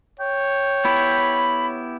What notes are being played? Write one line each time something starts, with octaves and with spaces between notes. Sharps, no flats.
C#5 G5
B3 E4 G4 B5